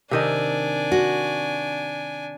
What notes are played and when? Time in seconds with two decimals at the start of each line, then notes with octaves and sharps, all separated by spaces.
0.11 C3 D#3 D4 D#5 G#5
0.92 F#4